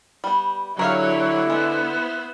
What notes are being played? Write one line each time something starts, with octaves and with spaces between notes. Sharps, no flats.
G3 B3
D3 F#3 E4 G4 A#4 C#5 E5 F5
G#3 B3 C5 E5